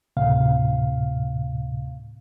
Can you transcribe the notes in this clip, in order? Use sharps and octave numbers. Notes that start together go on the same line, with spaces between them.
D2 A2 C3 F5